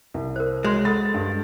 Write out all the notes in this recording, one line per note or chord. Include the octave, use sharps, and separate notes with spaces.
C2
A#4 C5
G#3 F#4 C#5
A4 F#5 B5 A6
G2